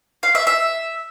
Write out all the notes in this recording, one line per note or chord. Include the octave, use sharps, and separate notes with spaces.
F5
E5
E5